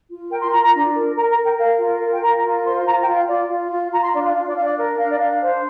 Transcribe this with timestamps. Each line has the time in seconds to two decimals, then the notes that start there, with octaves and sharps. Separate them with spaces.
0.09 F4
0.30 A#4 G5
0.41 C6
0.51 F4 A#5
0.62 A#5
0.73 D4
0.94 A#4
1.15 A#4 A#5
1.30 A#5
1.37 A#4
1.43 G5
1.58 A#4 F5
1.79 F4
2.00 A#4
2.11 G5
2.21 A#4 A#5
2.43 F4
2.64 C5 C6
2.85 F4 A#5
3.00 G5
3.07 F4
3.14 F5
3.28 F4 D5
3.49 F4
3.70 F4
3.91 F4 A#5
4.02 C6
4.13 D4 D5
4.23 F5
4.34 D4 F5
4.45 D5
4.54 D4 F5
4.63 D5
4.77 A#4
4.98 D4 F5
5.08 D5
5.18 D4 F5
5.41 C5